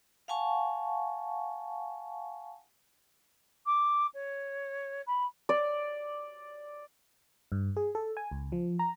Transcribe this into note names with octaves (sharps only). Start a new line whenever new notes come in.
F5 F#5 G#5 A5 C#6
D6
C#5
B5
D5
G2
G#4
A4
G#5
C#2
F3
A#5